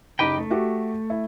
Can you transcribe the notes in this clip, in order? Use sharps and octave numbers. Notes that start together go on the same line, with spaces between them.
F#1 D#4 G4 B4 G5 A#5
A3
F#4 G4 E5
E4